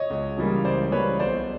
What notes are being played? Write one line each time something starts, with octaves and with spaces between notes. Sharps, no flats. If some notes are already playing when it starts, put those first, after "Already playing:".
Already playing: C#5 D#5
C#2
C#3 E3 G3 A#3
C#2 C5 D5
C#3 E3 G3 A#3 B4 C#5
B1 C5 D5